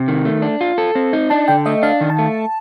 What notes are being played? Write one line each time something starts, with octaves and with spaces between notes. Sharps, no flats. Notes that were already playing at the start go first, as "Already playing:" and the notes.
Already playing: C3
D#3
A3
D4
F4
A4
C4
D#4
D4 A5
D3 G5
A3 D#5
D4 F5
D#3
A5
A3